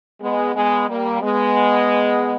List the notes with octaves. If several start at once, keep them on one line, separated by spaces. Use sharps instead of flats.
G#3 B3
G#3 B3
G3 A#3
G#3 B3